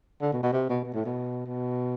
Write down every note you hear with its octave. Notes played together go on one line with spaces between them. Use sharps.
D3
B2
B2
C3
B2
B2
A2
B2
B2